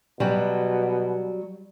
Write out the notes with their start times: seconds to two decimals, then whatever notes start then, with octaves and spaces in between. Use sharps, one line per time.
0.20 B2 F#3 G3